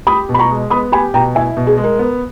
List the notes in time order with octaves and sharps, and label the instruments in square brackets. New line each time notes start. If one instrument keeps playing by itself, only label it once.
[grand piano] G4 [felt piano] B5 D#6
[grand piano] B2
[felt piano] B5
A#5 C#6
[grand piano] G#3
[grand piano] B3 [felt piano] B5 D#6
[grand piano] G4 [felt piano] G#5 B5
[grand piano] B2 [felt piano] G5 A#5
[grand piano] E4 [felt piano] E5 G#5
[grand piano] B2
[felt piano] G#4
[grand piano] G#3
[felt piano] A#4
[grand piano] B3